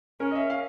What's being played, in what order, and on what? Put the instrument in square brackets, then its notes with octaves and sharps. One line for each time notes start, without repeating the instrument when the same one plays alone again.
[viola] C#4 [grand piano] A#4
[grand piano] D#5
E5
F5